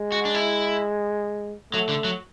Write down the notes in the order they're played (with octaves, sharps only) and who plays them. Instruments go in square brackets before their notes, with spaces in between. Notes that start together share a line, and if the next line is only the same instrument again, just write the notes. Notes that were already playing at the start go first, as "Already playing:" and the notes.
Already playing: [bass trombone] G#3
[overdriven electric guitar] F#4
D4
E4
[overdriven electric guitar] F#3 [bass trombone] A3
[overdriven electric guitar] D3
F#3